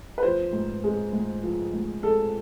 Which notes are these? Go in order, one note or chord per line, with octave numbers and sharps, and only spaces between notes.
B4
F3 C5
G#2
G#3
G#2
F3
G#2
G#3 A4